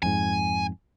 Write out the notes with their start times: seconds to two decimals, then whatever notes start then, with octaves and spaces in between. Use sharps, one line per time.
0.03 F2 G#2 G#5